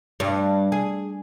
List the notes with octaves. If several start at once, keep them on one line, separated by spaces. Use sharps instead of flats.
G2
G#4